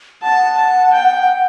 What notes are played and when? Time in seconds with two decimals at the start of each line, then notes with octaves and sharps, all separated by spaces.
0.22 F#5 A5
0.57 A5
0.93 G5